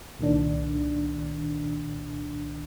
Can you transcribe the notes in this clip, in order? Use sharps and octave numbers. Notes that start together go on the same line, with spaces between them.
C2 A#2 D#3 D4